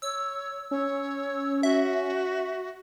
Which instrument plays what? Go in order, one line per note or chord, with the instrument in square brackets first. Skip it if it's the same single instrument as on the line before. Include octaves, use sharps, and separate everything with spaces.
[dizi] C#5 [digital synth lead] E6
[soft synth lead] C#4 [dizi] C#5
[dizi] F#4 [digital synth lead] E5